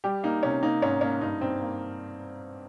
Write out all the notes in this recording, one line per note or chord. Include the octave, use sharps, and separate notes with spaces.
G3 G4
A#3 D#4
C3 C#4
A#3 D#4
G#2 C#4
A#3 C#4
G2 D#4
G2 C4
A#3